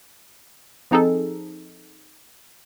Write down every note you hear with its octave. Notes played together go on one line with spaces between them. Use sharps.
F3 C4 D#4 G#4 A4